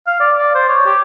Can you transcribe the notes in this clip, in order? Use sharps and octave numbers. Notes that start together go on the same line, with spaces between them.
F5
D5
D5
C5
C#5
G4